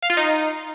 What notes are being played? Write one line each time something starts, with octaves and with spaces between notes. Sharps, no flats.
F5
F4
D#4